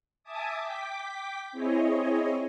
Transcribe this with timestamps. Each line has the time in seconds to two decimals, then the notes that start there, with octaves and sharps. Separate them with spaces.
0.24 E5 G#5 A5 D6 D#6
0.60 G5 D6 B6
1.52 C4 E4 G#4 C#5 D#5